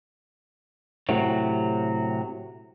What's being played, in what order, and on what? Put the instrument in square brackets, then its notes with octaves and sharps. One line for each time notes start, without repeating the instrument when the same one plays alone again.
[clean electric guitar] A2 C3 F#3